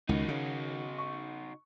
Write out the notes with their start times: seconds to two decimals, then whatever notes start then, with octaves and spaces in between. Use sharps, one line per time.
0.09 C#2 D#3 D#4 F#4
0.28 C#3
0.98 C#6